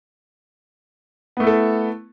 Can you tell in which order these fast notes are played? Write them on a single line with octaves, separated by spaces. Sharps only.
B3 A3 E4 A4